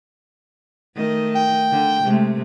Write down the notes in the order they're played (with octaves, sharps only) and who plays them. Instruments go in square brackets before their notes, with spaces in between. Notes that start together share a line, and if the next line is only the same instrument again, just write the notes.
[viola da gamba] D#3 A3 D#5
[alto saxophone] G5
[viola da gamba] D3
C3 G#3 A3